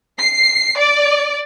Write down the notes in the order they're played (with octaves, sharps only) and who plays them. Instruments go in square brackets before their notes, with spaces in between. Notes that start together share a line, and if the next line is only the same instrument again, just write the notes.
[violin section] C7
D5